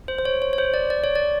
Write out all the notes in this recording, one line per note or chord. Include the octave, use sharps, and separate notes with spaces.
C5
C5
C#5
C#5
C#5
C5
D5
D5
C#5
D5